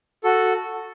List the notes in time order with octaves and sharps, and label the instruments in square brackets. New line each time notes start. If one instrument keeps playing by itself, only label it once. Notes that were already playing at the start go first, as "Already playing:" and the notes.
[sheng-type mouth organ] F#4 A4